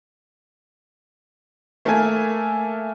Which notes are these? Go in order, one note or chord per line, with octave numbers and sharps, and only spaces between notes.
A3 A#3 A4 A#4 E5 G#5